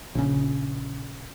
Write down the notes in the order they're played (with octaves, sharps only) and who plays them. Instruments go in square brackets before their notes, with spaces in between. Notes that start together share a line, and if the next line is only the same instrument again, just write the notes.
[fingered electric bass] A#1 C#3